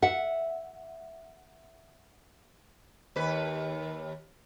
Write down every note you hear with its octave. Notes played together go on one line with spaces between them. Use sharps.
E5 F#5
D#2 B4